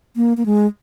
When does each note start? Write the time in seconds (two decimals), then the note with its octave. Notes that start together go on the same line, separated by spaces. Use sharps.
0.16 A#3
0.37 A#3
0.46 G#3